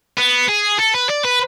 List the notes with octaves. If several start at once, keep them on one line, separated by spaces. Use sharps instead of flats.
B3
G#4
A4
B4
D5
B4